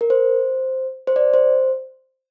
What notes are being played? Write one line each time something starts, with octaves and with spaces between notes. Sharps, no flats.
A#4
C5
C5
D5
C5